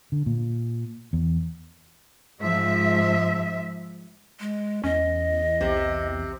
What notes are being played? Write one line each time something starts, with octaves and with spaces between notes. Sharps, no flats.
D3
A#2
E2
G#2 F3 E5
G#3
E2 C#4 D#5
B1 C3